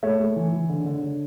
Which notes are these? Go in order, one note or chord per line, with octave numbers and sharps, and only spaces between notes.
A3 C#5 E5
A3
E3
E3
D3
D3
D3